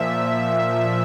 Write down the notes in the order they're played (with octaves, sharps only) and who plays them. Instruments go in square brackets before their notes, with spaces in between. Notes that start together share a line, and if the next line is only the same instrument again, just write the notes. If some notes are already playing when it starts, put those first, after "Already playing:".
Already playing: [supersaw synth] A#2 F3 E5